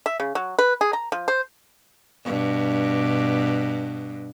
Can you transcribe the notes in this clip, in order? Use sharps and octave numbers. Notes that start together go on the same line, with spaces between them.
E5
C#3
F#3
B4
G#4
A#5
F3
C5
G2 B2